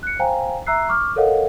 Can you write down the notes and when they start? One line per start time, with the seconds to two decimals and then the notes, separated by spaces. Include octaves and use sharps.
0.03 F#6 C#7
0.19 C5 F5 G5 G#5 A#5
0.67 E5 A#5 E6 F#6 C7
0.89 C#6 D6 F6
1.16 A4 A#4 C#5 D#5 F5 F#5